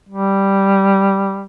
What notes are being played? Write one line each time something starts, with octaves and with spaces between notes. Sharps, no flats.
G3